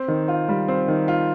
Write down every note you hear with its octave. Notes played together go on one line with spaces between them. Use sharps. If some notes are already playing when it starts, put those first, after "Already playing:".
Already playing: C4
D#3
F4
G3
C4
D#3
F4